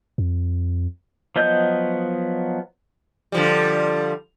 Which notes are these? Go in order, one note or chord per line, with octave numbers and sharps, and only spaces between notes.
F2
F3 F#3 B3 D#5 G6
D3 F3 G3